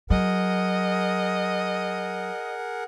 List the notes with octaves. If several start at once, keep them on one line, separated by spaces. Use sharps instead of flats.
F#3 G#4 A#4 D#5 F#5